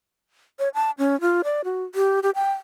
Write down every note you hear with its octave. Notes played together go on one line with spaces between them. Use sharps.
C#5
A5
C#4
F4
D5
F#4
G4
G4
G5